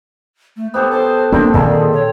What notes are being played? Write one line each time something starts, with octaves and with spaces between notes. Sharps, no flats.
A3
B3 G4 A4 C5
C5 A5
A#3 C4 D4
A#2 D#3 G#4 A4
C#5